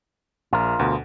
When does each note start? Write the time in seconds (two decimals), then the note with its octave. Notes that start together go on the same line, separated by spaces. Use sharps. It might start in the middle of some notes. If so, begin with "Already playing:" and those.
0.53 A#1 F4 A#4
0.79 D2 B2